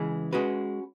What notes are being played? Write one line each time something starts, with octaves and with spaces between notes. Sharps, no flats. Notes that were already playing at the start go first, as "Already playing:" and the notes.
Already playing: C#3 E3 G#3
G#3 C#4 F#4 B4